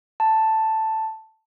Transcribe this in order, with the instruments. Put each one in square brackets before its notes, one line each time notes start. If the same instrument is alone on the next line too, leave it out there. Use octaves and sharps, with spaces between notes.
[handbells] A5